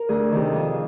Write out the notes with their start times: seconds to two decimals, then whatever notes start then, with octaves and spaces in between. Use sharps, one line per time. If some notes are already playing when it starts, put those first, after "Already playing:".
Already playing: A#4
0.09 D2 G#4
0.31 C3 D#3 G#4
0.43 A4
0.52 F2 G#4